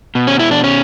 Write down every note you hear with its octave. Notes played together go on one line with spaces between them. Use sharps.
B2
C#4
E4
D4
C#4